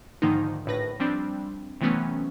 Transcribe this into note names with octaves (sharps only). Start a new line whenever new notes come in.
G#2 D3 D#3 F3 A#3 D#4
A#1 A2 B4 A#6
F3 G3 C4 D4
C3 E3 F#3 A3 B3 C#4